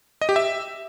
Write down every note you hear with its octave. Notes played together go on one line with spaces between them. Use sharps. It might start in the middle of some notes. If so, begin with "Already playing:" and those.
D#5
G4
E5